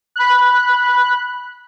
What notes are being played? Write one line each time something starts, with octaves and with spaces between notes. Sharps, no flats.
B5 F#6